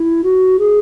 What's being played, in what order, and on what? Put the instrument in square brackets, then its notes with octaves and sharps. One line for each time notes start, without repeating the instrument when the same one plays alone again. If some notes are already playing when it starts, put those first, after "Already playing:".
Already playing: [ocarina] E4
F#4
G#4